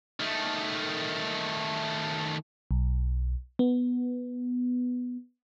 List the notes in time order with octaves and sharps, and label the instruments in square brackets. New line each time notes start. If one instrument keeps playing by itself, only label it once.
[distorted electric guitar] D#3 A3
[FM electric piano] B1
B3